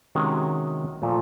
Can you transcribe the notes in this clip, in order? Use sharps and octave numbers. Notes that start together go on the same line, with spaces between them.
C3 D#3 G#3 C#4 F#4
A#2 F3 A3